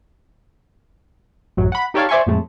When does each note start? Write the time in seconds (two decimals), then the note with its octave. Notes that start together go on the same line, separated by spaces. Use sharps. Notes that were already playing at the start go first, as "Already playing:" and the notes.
1.57 A1 F#2 F#3
1.72 F#5 B5
1.94 D#4 G4 A4 C#5 D5 F5
2.09 C5 D5 E5 G#5 C6 C#6
2.26 F2 A2 G#3 A3